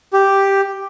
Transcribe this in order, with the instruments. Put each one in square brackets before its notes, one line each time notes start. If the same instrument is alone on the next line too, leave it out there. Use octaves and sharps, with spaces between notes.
[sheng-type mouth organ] G4